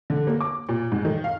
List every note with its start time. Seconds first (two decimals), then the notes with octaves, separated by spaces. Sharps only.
0.10 D3
0.27 A#3
0.41 D6
0.69 A#2
0.92 G#2
1.05 D#3
1.24 F5